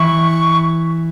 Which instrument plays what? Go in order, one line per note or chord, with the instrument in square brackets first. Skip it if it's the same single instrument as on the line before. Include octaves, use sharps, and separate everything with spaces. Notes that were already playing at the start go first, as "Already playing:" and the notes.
Already playing: [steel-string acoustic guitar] E3 E4 [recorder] C#6